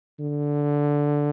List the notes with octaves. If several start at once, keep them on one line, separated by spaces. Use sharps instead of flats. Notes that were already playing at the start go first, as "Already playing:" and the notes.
D3